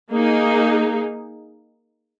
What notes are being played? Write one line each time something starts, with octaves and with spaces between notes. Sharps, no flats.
A#3 D#4 G#4